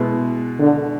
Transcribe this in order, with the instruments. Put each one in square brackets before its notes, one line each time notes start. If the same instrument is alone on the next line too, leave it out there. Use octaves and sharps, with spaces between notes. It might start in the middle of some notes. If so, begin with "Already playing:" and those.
Already playing: [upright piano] B2 G#3 B3 E4
[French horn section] D3